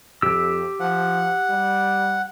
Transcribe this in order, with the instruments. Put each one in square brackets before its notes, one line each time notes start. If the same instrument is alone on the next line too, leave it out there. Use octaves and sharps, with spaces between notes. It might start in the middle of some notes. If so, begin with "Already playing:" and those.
[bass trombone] F2 [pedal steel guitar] G4 E6
[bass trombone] F3 [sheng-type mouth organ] F#5
[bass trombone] G3